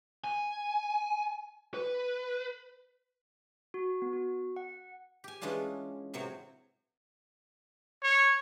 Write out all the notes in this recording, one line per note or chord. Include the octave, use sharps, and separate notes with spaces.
G#5
B4
F#4
B3
F#4
F#5
G4 G#5
E3 G#3 C#4 D4 F4
A2 C3 F#3 C4 C#5
C#5